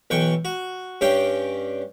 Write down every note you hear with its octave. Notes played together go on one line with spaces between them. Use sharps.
B1 E3 G5 C#6
F#4
G2 C#4 G4 G5